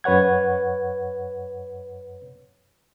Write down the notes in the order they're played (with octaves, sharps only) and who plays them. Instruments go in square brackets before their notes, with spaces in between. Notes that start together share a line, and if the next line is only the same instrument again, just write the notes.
[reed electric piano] F#2 B4 C#5 F#5 G#6